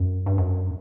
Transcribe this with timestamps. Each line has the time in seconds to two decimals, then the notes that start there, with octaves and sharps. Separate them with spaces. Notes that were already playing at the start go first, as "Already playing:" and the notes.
Already playing: F#2
0.26 G2
0.38 F#2